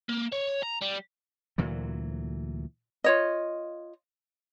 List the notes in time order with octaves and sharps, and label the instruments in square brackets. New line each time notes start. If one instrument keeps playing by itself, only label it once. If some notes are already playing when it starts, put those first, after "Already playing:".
[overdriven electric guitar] A#3
C#5
A#5
G3
[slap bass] D2 A#2 E3 F#3
[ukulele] F4 C#5 D#5